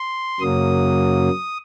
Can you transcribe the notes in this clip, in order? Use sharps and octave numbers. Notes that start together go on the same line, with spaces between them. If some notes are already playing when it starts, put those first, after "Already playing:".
Already playing: C6
F#2 C#3 F#3 A#3 D#6